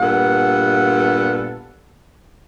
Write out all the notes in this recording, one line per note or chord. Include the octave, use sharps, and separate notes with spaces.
G2 A#2 B3 A4 F#5